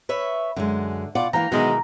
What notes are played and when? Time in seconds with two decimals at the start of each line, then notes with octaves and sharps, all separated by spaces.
0.09 B4 C#5 E5
0.56 F#2 D3 G#3
1.15 B2 F4 D5 F#5
1.33 E3 A#3 F5 G5 A#5
1.52 B2 D#3 E3 F#3 G#3 B3 D#4